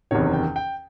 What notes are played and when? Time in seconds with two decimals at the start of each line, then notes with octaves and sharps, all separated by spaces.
0.11 F#1 E2 C3 D#3 C#5
0.33 G5
0.56 G5